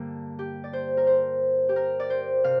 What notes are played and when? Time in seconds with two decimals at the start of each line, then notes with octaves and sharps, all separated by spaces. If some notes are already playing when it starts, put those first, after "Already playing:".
Already playing: G2 D3 A#3
0.39 G4
0.64 D5
0.73 C5
0.97 A#4
1.07 C5
1.69 G4
1.76 A#4
2.00 D5
2.10 C5
2.44 C3 F5